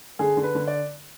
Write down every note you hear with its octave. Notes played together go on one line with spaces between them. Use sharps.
D3 G#4
D3
B4
D3
D5